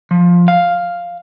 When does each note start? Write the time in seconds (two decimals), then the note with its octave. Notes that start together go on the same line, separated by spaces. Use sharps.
0.11 F3
0.48 F5